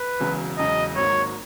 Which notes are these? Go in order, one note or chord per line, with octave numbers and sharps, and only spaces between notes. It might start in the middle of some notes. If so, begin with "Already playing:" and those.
Already playing: B4
E1 E2 C#3 F#3
E1 E2 C#3 F#3 D#5
G#1 G#2 F#3 A#3 C#5